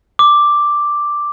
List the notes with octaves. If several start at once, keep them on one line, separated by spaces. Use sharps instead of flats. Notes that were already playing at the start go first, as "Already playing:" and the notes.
D6